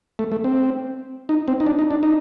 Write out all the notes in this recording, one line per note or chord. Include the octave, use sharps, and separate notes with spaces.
A3
A3
C4
D#4
C4
D#4
D4
D#4
D4
D#4